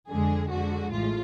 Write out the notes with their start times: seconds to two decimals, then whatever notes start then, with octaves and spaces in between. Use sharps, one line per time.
0.08 F2 D3 G#3 G#4
0.50 F2 D3 G#3 F#4
0.91 A1 A2 G#3 F4